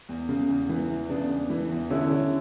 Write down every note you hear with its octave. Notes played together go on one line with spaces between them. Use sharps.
E2
C#3
E2
E3
E2
C#3 B3 D4
E2
E3
E2
D3 C#4 E4
D3